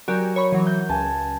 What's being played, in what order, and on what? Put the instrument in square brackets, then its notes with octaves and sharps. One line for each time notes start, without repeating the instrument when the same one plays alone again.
[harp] F#3 F#4 A#4 [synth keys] G4 D5 G#5
[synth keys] C#5 B5 C#6
E3 F#3
[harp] G6
[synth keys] C#2 [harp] G#5 A5